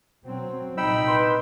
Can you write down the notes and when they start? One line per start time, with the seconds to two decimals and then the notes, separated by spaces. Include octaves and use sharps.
0.22 B2 F#3 C4
0.77 C2 A#2 D#4 G5 B5 E6
1.07 B4 C6